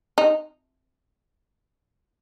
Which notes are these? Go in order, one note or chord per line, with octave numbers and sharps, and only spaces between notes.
D#4